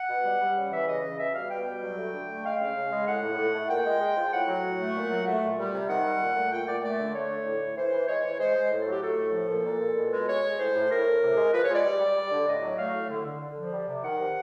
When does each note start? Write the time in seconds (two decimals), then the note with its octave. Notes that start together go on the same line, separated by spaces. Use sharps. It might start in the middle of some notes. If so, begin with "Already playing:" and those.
Already playing: F#5
0.09 B2
0.25 G3
0.41 G3
0.56 C#3
0.72 E3 E5
0.87 C#3 D#5
1.03 C#3
1.19 B2 E5
1.35 G3 F5
1.50 B2 G5
1.66 G3
1.82 F#3
1.98 A3
2.13 D3
2.28 A3
2.44 G#3 F5
2.60 C#3
2.76 C#3
2.91 G#3
3.07 A2 F#5
3.22 A2
3.38 A2
3.55 A3
3.69 A#2 G5
3.85 G#3
4.01 G#3
4.17 F3
4.32 A2 F#5
4.48 F#3
4.64 A2
4.79 A3
4.95 A#2
5.11 F#3
5.27 A3
5.42 A#2
5.58 G3
5.73 C3
5.89 D#3 F#5
6.04 G3
6.20 A#2
6.36 A3
6.52 A#2 G5
6.67 A#2 D5
6.83 A3 D5
6.99 D3
7.14 A3 C#5
7.30 D3
7.45 A2
7.61 A2
7.77 E3 C5
7.92 E3
8.08 G#3 C#5
8.24 E3
8.40 G#3 C5
8.55 G#3
8.71 A2
8.81 A4
8.87 F#3
8.92 G4
9.02 A3 A4
9.18 A2
9.33 F3
9.49 A#2
9.65 A#2
9.81 A#2
9.96 B2
10.12 G#3
10.28 G#3 C#5
10.44 G#3
10.59 A2 C5
10.75 A2
10.90 A2 A#4
11.06 A2
11.22 C3
11.37 G#3
11.53 F3 B4
11.64 C#5
11.69 G#3 D5
11.84 G3
12.00 G3
12.16 G3
12.31 D3
12.47 A2 D#5
12.62 F#3
12.78 A3 F5
12.94 A2
13.10 D3
13.25 D3
13.41 D3
13.57 F3
13.72 G3
13.87 C3
14.04 D#3 F#5
14.19 C3